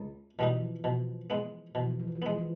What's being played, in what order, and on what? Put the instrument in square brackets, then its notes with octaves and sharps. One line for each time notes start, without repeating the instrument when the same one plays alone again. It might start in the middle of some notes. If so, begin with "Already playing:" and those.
Already playing: [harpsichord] C#2
[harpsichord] B2 G3 B3 D#4 [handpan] E3
[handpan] F3
[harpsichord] B2 [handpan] F3
[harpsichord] G#3 B3
[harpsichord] B2 [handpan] E3
[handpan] F3
E3
F3
E3
F3
[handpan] E3 [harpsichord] B3
[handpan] F3 [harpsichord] G#3
[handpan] E3